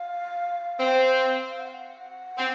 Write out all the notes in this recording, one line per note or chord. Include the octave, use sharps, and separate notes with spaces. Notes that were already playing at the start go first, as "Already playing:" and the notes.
Already playing: F5
C4
F5
F#5
C4